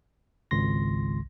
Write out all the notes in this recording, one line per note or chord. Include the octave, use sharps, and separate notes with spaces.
G#1 C#2 C6 A#6